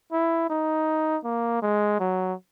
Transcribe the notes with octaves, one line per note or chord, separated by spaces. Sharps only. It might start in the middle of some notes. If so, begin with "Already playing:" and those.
E4
D#4
A#3
G#3
F#3